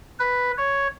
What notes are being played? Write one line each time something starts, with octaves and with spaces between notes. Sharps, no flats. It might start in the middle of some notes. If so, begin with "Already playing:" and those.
B4
C#5